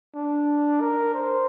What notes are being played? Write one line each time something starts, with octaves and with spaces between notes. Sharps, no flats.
D4
A#4
C5